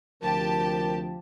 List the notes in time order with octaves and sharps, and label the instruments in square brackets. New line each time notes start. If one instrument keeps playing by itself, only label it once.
[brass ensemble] D2 C3 F3 [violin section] G4 A5 [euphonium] A#4